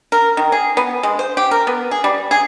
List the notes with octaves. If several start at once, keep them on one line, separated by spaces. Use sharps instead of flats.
A#4
D#3
G#4
B3
G#3
C5
G4
A#4
B3
G#4
G3
G#4